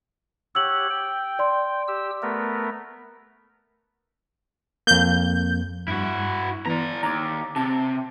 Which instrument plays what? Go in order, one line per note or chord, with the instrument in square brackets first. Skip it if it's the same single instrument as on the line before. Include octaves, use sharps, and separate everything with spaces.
[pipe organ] G4 C#5 F#5 [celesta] E6 F#7
[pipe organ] G5
[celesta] D5 C6
[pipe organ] G4 E6
A3 B3 A#4
[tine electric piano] F2 A#3 [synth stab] G6
[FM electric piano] G2 [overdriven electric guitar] E4 F#4
[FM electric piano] E3 B3 [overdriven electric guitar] D5 A#5
[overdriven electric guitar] D#2 [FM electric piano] A#5 D6
[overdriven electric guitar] C3 [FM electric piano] A5